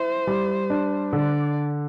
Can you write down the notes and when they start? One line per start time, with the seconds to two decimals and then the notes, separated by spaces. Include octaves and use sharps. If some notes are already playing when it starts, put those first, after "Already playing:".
Already playing: E4 C5
0.27 G3
0.70 D4
1.13 D3 D5